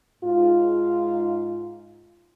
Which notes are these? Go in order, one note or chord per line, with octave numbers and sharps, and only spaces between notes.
G#2 F4